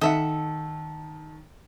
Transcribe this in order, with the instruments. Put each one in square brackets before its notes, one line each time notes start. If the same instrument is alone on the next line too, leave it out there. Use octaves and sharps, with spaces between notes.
[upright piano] D#3 [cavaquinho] A4 [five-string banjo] D#5 E5 F#5